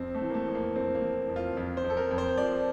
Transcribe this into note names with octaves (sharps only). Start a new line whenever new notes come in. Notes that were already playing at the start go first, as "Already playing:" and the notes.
Already playing: F2 C4
A3
E3
A#3
A3
F2
A#3
F2 C4
A#3
E3
F2
F4
F2
C5
F2
A4
A#4
F2
C5
F3 D5